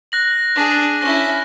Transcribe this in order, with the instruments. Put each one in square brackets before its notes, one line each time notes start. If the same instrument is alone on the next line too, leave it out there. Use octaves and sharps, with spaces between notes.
[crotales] F#6 A#6 F#7
[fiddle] D4 G#4
[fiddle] C#4 E4 [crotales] A#6